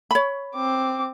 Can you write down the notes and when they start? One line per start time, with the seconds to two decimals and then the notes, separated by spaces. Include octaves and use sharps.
0.11 C#5 B5
0.55 C4 D6